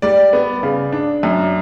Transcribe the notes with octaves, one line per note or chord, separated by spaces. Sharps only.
G3 D5
B3
C#3
D4
F#2